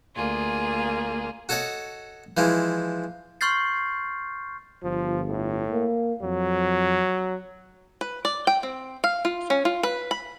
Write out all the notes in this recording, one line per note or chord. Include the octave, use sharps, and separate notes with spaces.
D2 A#3 F4 G#4
F#4 A4 C#5 D#5 F#5
E3 F3 G#3 E4
C6 C#6 F6 G6 A6 C7
G1 F3
A2
A#3
F2 F#3
B4
D5
G5
C4
F5
F4
C#4
F4
B4
B5